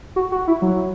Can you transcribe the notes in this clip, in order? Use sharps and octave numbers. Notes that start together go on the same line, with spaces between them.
F#4
F#4
E4
F#3